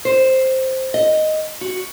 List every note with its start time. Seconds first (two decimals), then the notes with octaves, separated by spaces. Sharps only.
0.05 C5
0.94 D#5
1.61 F#4